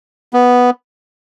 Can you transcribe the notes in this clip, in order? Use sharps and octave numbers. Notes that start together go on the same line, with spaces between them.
B3